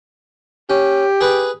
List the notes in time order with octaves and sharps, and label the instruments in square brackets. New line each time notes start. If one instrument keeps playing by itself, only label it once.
[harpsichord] C#4 [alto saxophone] G4
[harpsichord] G#4 B4